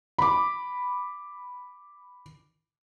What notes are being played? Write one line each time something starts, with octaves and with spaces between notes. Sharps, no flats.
B5 D6